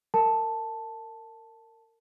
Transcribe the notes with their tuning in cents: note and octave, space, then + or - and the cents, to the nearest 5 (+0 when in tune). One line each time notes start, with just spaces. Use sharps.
A#4 -30 A5 +0